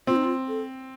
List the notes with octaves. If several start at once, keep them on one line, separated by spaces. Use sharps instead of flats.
C4 F4
D#4
F4
A4